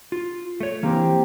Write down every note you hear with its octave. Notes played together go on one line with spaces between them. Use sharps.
F4
A3 C#5
E3 A#3 C4 G4